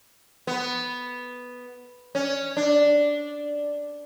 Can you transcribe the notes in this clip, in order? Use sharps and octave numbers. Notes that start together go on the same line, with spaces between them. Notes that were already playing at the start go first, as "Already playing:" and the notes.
B3
C#4
D4